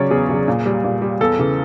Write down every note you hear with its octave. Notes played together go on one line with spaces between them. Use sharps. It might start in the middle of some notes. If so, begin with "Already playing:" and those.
Already playing: C#3 F#3 C#5 D5
E2 G#4
C#3 F#3
A#2
G3
A#2
G3
E2 A4
C#3 E3